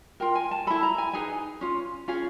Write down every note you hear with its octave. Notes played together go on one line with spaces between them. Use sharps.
F4 A#4 G5
G#5
A5
E4 A4 B5
A#5
G#5
D#4 G#4 B4 G#5
C#4 F4
C#4 F4 G#4